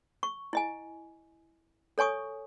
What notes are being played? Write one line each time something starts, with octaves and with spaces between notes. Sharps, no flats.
C#6
E4 D#5 G#5
A4 C#5 G#5 C#6 D#6